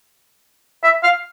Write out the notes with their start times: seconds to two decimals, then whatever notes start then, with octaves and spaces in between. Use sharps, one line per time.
0.83 E5
1.03 F5